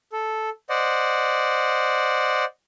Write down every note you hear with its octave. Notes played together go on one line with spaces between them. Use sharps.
A4
C5 D5 D#5 F#5